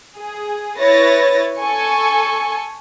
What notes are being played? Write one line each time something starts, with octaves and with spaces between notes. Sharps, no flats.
G#4
E4 B4 C#5 A6 A#6
A4 G#5 C#6